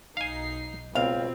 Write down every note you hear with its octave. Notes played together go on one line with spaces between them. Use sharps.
B1 D#4 F5 G#5 C7
C#2 B2 C4 F4 F5